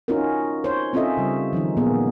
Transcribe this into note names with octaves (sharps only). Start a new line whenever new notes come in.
C#4 D#4 F4 F#4 A#4
C5 C#5
C4 C#4 F4 A4 D#5 E5
C#3 G3
D#3 F3 F#3 D#4
A#2 A#3 B3 G#4